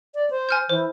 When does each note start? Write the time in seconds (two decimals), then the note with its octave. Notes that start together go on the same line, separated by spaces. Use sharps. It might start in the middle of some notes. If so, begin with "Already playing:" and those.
0.15 D5
0.30 C5
0.49 G#5 F6 G6
0.69 E3 C5